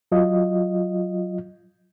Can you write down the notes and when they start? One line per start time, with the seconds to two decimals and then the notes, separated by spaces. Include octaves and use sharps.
0.12 F#3 F4 D#5